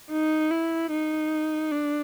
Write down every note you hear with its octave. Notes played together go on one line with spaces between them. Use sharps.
D#4
E4
D#4
D4